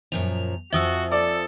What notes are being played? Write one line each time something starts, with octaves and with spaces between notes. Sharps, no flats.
F#2 A#2 F3 F7
F2 F3 F#4 E5 G#5 D#6 E6
A4 D5